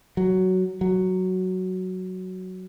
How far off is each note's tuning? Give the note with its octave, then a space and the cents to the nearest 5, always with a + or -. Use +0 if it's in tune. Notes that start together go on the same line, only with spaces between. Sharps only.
F#3 +5
F#3 +5